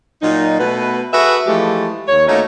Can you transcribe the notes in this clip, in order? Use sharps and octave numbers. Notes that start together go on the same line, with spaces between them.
A#2 F#3 D#4
B2 A3 B3 B4
F#4 G#4 A4 B4 E5
E3 F3 G#3 A3 G4
D#2 C#5
A3 A#3 C#4 D#4 F#4